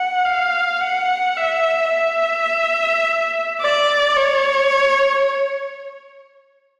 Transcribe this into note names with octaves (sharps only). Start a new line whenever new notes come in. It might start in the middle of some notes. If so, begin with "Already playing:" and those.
Already playing: F#5
F5
F#5
E5
E5
D5
C#5